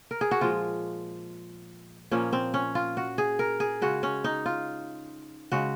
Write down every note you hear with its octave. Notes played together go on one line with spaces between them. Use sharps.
A#4
G#4
F#4
A#2 F3 G#3 F4
A#2 F3 A#3 C#4
C4
C#4
F4
F#4
G#4
A#4
G#4
C#3 G#3 F#4
C#4
D#4
F4
C#3 G#3 F#4